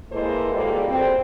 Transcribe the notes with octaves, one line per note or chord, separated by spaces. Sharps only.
G#3 A#3 E4 A4 B4 C5
A#2 G3 A#3 F#4 G#4 A4
C4